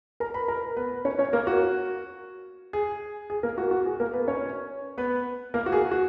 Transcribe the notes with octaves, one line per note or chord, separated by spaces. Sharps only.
A#4 A#5
B4 B5
A#4 A#5
B3 B4
C#4 C#5
C#4 C#5
A#3 A#4
F#4
G#4
G#4
A#3 A#4
F#4
F#4
G#4
A#3 A#4
B3 B4
C#4 C#5
B3 B4
A#3 A#4
F#4
G#4
F#4